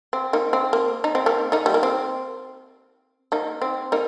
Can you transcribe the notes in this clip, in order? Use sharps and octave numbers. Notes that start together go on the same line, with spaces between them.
C4
A#3 D#4
C4
A#3
D#4
C4
A#3 D#4
A#3 D#4
G3
A#3
C4
A#3 D#4
C4
A#3 D#4